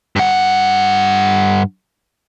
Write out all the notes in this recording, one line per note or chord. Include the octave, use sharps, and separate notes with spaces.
G2 F#5